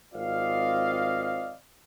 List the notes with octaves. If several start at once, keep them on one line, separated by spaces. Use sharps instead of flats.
G#1 C4 F4 D5 D#5 F5